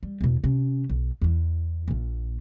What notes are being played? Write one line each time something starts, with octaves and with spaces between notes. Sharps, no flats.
G3
E2 B2
C3 C#4
B1
E2 E3
A#1 A#2